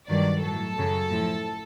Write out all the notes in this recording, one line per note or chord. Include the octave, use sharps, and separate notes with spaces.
G2 D#3 F#3 D5
A2 F#3 A4
F#2 C#3 F#3
A2 F3